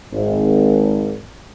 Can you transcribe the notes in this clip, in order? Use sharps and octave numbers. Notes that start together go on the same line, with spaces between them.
G#1